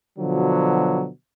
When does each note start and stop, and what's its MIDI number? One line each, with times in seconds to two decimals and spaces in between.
0.19 1.08 47
0.19 1.08 50
0.19 1.08 53
0.19 1.08 54